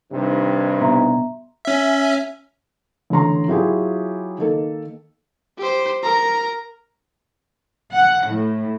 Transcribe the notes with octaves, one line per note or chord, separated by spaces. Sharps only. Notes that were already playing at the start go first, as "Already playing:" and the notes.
G2 C3 D#3
B2 E5 A#5 C6
C#4 E5
A1 D3 A#5 C6
F#3 E4 F4 G4 G#4
D#3 A#3 A4
G4 C5
A#4 A#5
F#5
A2